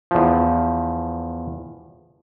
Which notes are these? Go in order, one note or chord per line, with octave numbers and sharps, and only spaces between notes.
E2 F3